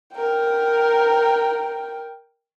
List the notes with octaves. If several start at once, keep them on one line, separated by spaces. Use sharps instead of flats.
A#4 G5